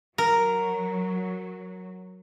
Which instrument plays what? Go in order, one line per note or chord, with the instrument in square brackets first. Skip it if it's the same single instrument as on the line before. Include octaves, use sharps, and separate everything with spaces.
[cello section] F#3 [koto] A#4